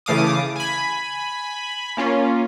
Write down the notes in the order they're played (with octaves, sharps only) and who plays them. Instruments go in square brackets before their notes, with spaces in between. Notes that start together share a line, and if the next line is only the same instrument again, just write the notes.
[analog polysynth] C#3 E3 A3 F5 D6 D#6
G#5 B5
A#3 C#4 F4